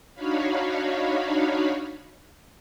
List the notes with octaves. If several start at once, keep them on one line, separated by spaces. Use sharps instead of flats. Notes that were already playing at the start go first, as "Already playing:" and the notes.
D4 D#4 F#4 C#5 F5 B5